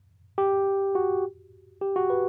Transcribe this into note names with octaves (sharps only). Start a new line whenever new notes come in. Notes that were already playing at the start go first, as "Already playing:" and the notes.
G4
F#4
G4
F#4
B4